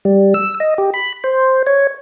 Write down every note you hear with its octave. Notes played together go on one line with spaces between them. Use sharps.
G3
E6
D#5
G4
B5
C5
C#5